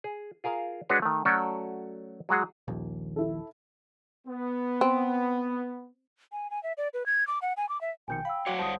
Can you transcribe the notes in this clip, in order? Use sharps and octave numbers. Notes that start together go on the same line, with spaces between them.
G#4
F4 G#4 A#4 F5
G#3 D4 F#4 G#4 B4 C#5
D#3 A3
F#3 A3 C#4 F#4 A4 D5
F#3 G#3 F#4 G#4
D#1 A#1 D#2
E4 A4
B3
C4
G#5
G#5
E5
D5
B4
G#6
D6
F#5
G#5
D6
E5
A#1 B2 D#3 G5 G#5 G6 C#7
F5 F#5 B5 E6
F#3 F#4 C#5 F5 F#5 D6
G1 G3 C5 A5 D#6